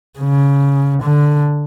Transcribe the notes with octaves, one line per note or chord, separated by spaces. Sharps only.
C#3
D3